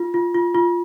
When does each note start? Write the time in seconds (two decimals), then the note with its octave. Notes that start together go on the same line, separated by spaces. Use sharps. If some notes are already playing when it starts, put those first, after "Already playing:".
Already playing: F4
0.14 F4
0.34 F4
0.55 F4